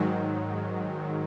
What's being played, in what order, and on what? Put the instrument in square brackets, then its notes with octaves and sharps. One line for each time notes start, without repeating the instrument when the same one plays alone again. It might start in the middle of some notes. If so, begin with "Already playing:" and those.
Already playing: [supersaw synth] G#2 D#3 F#3